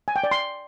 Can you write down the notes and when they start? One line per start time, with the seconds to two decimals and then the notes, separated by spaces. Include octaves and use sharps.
0.08 G#5
0.16 G5
0.24 D5
0.31 C6